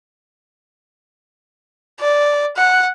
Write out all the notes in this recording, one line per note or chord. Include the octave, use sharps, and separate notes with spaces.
D5
F#5